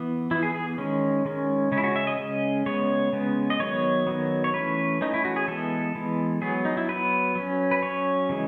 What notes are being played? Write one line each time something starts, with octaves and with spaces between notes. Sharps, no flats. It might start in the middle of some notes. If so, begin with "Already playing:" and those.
Already playing: E3 B3
E3 B3 E4
G#4
G#4
D#3 G#3 C#4
D#3 G#3 C#4
C#3 G#3 C#4
E4
F#4
E5
D#5
C#3 G#3 C#4
C#3 G#3 B3 C#5
C#3 G#3 B3
D#5
D#3 F#3 B3 C#5
D#3 F#3 B3
C#5
E3 A3 C#4 B4
E3 A3 C#4 D#4
E4
F#4
G#4
E3 G#3 B3 A4
E3 G#3 B3
F#3 B3 G#4
D#4
E4
F#3 B3 B4
F#3 C#4
B4
F#3 C#4 C#5
C#3 E3 G#3